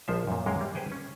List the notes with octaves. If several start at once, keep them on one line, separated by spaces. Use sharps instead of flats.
A#1 F3 C5 E5
F#2 A#2
F#2 G#3 A#3 F5 G5
G3
G#4 B4 C5 G5 G#5
C#4